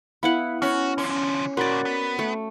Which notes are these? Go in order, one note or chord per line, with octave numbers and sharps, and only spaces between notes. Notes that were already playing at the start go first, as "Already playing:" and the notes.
B3 E4 F5 F#5 B5
C#4 F#4 F6
D3 F3 C#4
D2 A#2 F#4 A#4 D5 B5 A6
B3
A3